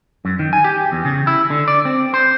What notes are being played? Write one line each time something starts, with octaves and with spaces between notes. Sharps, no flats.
F#2
D#3
G#5
G4
E2
C#3
E4
D3
D5
C4
C5